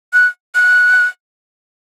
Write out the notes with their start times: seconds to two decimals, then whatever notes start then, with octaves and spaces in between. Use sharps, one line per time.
0.13 F#6
0.55 F#6